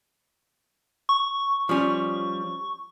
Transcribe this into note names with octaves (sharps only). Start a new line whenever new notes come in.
C#6
F3 G3 C#4